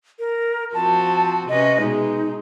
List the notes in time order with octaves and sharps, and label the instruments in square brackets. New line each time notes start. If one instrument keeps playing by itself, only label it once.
[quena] A#4
[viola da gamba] F3 C4 F#4 [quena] A5
[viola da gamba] C3 C#4 B4 [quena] D#5
[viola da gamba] B2 G#3 [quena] D#4